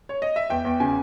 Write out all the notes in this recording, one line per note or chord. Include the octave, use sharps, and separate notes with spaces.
C#5
D#5
E5
E2 G5
E2
C#3 G#5